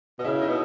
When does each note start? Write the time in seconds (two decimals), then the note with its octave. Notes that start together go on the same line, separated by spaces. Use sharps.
0.19 B2 D#5
0.24 C#3 E4 E5
0.42 D#4 D#5
0.49 B2